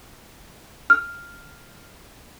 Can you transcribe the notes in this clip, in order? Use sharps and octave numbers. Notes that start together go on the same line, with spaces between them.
F6